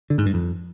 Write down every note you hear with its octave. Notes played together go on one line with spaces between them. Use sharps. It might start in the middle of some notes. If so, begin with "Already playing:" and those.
D3
G#2
G2
F2